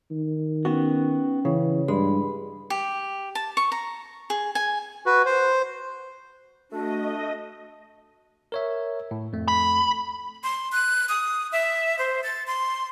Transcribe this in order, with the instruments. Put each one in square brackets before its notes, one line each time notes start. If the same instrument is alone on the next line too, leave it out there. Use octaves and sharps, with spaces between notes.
[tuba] D#3
[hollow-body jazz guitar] B3 F#4 [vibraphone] C#4 G5
[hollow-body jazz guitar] C#3 [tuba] E3
[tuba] G2 [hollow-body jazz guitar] G#3 [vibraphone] B5
[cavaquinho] G4
A5
C#6
A#5
G#4
G#5
[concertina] F#4 B4
C5
[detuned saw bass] A3 [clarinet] D4 [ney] F#4 [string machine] D#5
[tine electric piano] A#4 C#5 E5
A2
F2 A3
[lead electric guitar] B5
[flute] C6
F#6
D#6
E5
C5
A6
C6